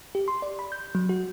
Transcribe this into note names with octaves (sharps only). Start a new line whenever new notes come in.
G4
C6
D5
B5
G6
F#3
F#4